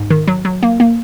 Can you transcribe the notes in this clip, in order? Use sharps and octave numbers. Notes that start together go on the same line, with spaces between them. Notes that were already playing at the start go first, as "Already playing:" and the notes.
Already playing: G#2
D#3
F#3
F#3
A#3
A#3